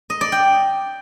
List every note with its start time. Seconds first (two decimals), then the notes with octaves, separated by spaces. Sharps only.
0.10 D#5
0.21 D5
0.32 G5